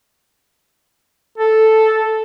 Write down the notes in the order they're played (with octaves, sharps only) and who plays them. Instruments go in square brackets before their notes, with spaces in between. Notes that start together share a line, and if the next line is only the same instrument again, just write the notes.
[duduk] A4